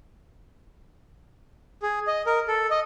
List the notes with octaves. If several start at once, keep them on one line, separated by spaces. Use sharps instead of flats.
G#4
D#5
A#4
A4
D#5